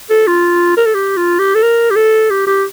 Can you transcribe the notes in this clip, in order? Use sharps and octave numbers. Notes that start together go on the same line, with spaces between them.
A4
F4
A#4
A4
G4
F4
G4
A4
A#4
G4
A4
G4
G4